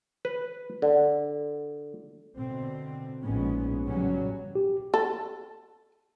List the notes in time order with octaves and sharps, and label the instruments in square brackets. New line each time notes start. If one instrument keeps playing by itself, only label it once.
[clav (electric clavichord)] B4
D3
[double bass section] B2 D3 C4
A#1 G#2 G#3 B3 C#4
A1 G2 C#3 F#3 G3 C#4
[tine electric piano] G4
[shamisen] A4